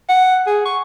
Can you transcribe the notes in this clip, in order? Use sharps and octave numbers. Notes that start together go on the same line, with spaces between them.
F#5
G#4
C#6